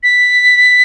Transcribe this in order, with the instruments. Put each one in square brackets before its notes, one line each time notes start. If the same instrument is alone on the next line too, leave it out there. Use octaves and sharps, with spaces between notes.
[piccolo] B6